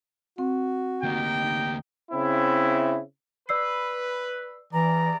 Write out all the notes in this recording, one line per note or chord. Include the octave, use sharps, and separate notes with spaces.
C4 F#4
D2 A#3 D#4 G4 G5
C#3 C4 E4
B4 D5 E6 C7
E2 G2 E3 D5 A#5